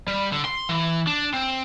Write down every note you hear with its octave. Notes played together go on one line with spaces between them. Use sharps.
G3
D3
C6
E3
D4
C4